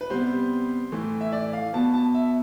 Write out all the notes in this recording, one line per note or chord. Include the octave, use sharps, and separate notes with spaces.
B4
C3 G3 B3 C5
A2 E3 A3
E5
D5
F5
B2 B3 A5
A5
E5